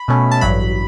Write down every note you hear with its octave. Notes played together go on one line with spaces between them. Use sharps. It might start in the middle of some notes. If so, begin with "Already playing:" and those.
Already playing: B5
B2 A3 C#4
A5
A1 G2 F#3 B5